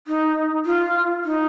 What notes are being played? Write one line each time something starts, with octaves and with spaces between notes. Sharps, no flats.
D#4
F4
D#4